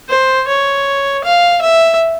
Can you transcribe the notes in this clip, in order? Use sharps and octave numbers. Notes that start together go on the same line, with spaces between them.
C5
C#5
F5
E5